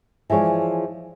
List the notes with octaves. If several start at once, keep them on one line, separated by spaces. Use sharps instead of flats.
E3 F3 G#3 C#5 D5